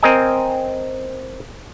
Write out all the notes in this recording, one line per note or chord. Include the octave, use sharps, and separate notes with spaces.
C4 A#4 D#5 G#5